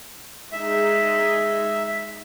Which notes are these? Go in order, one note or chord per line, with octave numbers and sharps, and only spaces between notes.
G#3 D#4 G#4 E5